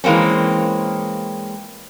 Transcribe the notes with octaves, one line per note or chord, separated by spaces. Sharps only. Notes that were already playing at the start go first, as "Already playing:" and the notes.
E3 G#3 A#3 C4 C#4